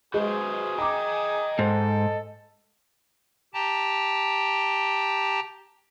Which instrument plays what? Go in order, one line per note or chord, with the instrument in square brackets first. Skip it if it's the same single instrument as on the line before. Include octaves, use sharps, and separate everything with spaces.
[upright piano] G#3 [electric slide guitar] F#4 B4 C5 [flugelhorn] G#4
[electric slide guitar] D#5 G5 [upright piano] A#5 D6
[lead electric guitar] G#2 [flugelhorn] A4 [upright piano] C5
[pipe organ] G4 G5 A5 A#5